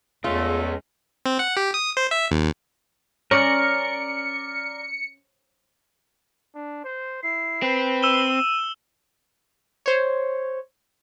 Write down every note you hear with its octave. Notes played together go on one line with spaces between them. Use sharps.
E2 G#3 A3 C#4 F4
C4
F#5
G4
D#6
C5
E5
D#2
C#4 A#4 D5 C#7
D4
C5
E4 C7
C4 B4
E6 D#7 E7 G7
C5 C#5